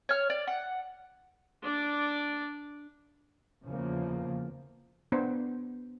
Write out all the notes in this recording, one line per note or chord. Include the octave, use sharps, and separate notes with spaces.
C#5 F6
D5
F#5
D4 D5
E2 C#3 F3 A#3
B3 D4 C5